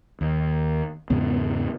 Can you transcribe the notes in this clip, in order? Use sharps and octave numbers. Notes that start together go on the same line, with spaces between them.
D#2
E2 G#2 C#3 B3